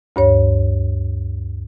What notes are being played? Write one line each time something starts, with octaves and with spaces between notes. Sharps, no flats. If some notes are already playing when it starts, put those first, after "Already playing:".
D2 G2 C#5